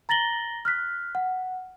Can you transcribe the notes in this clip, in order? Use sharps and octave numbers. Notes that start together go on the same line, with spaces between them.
A#5 A6 A#6 F#7 G7
F6 F#6 B6
F#5